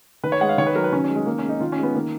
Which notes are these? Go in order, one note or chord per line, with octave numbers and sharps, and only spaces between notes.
D#3 B4
C#5
G#3 F#5
F5
D#3 C#5
B4
F#3 A#4
B4
D#3 C#4
G#3 C#4
G#3
D#3 A#3
G#3 C#4
D#4
D#3 F4
C#4
G#3 B3
D#3 A#3